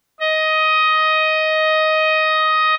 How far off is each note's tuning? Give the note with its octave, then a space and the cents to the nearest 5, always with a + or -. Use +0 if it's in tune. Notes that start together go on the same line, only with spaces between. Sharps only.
D#5 +10